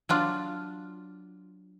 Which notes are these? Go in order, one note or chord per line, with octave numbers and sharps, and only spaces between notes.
F#3 D4 F4